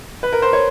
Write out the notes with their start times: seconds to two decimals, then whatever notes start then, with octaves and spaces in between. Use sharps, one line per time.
0.23 B4
0.33 A#4
0.42 C5
0.53 C#5